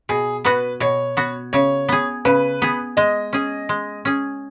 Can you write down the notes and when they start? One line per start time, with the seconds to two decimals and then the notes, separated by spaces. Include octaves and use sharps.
0.09 B2 G#4
0.45 B3 F#4 B4
0.80 B2 C#5
1.17 B3 F#4
1.53 C#3 C#5
1.89 B3 G#4
2.25 C#3 B4
2.62 B3 G#4
2.97 G#3 D#5
3.33 C#4 G#4
3.69 G#3
4.05 C#4 G#4